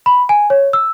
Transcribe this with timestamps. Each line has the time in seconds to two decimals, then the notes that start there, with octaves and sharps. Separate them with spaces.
0.06 B5
0.29 G#5
0.50 C#5
0.73 E6